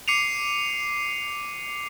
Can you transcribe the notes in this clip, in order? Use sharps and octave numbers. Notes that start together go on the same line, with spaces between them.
D6 C7 C#7 D#7 F7